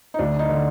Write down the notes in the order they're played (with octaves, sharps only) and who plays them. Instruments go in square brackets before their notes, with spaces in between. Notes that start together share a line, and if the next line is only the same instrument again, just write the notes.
[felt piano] D#4
D2 D4
D#4
D3